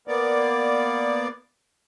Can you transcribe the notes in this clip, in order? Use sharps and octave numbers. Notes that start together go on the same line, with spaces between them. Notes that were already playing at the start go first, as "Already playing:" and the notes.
A#3 B3 D5